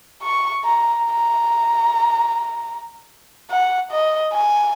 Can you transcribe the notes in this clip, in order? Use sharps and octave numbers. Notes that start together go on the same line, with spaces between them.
C#6
A#5
A#5
F#5
D#5
G#5